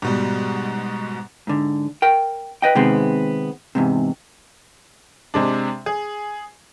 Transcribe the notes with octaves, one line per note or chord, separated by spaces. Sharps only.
G#2 B2 G3
G#2 D3
A#4 G5
B4 D#5 G5
C3 D#3 G#3 B3 C4
E2 G#2 C3
C3 G#3 D4
G#4